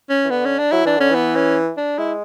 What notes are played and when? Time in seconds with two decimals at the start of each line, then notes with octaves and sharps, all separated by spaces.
0.10 C#4
0.24 E3
0.30 D3 B3
0.45 C#4
0.59 D4
0.72 F#3 E4
0.85 E3 D4
0.98 D3 C#4
1.11 E3 B3
1.35 C#4
1.77 D4
1.98 G#3 E4